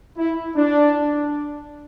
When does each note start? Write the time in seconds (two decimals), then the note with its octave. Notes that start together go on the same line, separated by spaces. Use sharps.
0.17 E4
0.56 D4